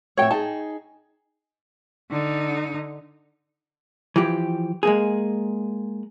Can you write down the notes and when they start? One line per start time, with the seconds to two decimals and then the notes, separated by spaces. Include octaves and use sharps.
0.17 F2 A2 C#5 E5 G5
0.31 D#4 G#4 A5
2.10 D3 D#4
4.16 E3 F3 G4
4.83 G#3 A#3 G#4